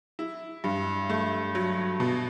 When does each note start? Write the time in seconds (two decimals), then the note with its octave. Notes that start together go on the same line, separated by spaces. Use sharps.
0.19 E4
0.64 G2
1.09 A3
1.55 F#3
2.00 B2